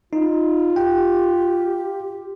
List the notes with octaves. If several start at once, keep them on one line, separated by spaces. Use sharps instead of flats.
D#4 F4
G4 G5